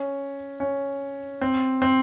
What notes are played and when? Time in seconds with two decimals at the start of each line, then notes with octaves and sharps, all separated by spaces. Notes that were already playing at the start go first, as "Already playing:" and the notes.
Already playing: C#4
0.60 C#4
1.41 C4
1.82 C4